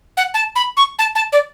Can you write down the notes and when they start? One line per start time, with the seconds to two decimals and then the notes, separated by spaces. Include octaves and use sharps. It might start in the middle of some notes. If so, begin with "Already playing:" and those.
0.17 F#5
0.34 A5
0.56 B5
0.77 C#6
0.99 A5
1.15 A5
1.32 D5